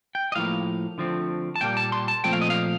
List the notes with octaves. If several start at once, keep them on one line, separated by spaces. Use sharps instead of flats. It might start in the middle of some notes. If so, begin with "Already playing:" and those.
G5
D#5
A2 F3 A#3 F5
D3 F3 A3 C4
A5
A#2 G3 A#3 G5
A5
C6
A5
A#2 F3 A3 C4 G5
F5
D#5
F5